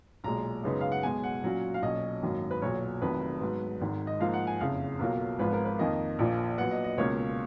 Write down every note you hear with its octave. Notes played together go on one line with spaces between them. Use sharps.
B1 A#2 G#3 A#5
F#2 C#3 G#3 B3 D#4
F5
F#5
B1 B2 G#3 G#5
F#5
A#2 F#3 C#4 F4
F5
B1 A#2 F#3 C#4 D#5
G#1 F#2 D#3 F#3 A#3
B4
B1 A#2 F#3 C#5
F1 F2 D#3 F#3 B4
G#2 F#3 B3
G#1 G#2 D#3
D#5
G#2 F3 A#3 D#4 F5
F#5
G#5
F#1 F2 C#3 F5
B1 B2 F#3 A#3 F4
G#1 G#2 F3 B3 F4 B4
A#4
B4
F2 D#3 A#3 D#5
A#1 A#2 F3 A#3
A#2 F#3 B3 F#5
D#5
D#5
C#2 B2 A#3 C#4 F4 C#5